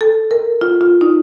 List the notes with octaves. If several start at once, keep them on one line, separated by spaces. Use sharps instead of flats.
A4
A#4
F4
F4
D#4